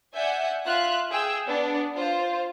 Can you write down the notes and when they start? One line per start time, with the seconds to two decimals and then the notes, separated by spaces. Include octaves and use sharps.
0.15 D5 E5 F#5 G#5 G6
0.65 F4 E5 F#6
1.10 G#4 G5 E6
1.47 B3 D4
1.96 F4 C5